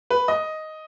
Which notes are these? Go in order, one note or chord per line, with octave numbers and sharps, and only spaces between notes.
B4
D#5